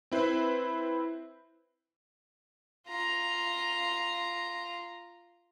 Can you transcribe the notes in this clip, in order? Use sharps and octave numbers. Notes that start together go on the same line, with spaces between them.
C4 E4 B4 C5
F4 A#5